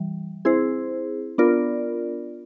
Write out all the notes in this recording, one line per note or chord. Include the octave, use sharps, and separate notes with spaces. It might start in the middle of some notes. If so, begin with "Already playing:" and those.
Already playing: E3 G3
C4 E4 G#4 C5
B3 D4 F4 A#4 D5